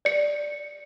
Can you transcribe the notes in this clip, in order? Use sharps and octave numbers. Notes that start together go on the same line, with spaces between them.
D5 C#7